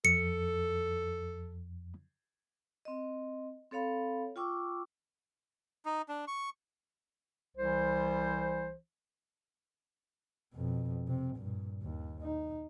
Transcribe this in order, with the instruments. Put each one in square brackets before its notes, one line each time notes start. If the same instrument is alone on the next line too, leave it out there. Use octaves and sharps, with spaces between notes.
[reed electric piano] F2 [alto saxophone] A4 [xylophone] C#7
[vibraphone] C4 D#5
C4 A4 C#5 F5 B5
F4 G5 C#6 D6 E6
[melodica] D#4
D4
C#6
[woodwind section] C2 E3 C5
[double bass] F2 B2
C3 C4
G2 A#2
D#2
D#4